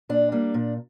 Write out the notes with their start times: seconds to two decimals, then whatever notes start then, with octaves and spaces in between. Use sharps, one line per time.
0.09 A#2 D4
0.32 G3 A#3
0.54 A#2